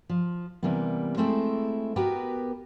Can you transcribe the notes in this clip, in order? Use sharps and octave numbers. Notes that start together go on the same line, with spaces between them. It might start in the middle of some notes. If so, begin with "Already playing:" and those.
F3
C3 E3 G3 A#3 B3
G#3 A3 C4 E4 A4 C5
B3 F#4 G4 A#4 B4